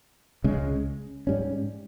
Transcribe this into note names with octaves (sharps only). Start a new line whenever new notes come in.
C#2 C#3 G#3
G#2 G3 C#4